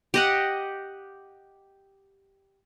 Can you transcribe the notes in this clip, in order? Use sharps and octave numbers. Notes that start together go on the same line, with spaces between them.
G4 D#5 F#5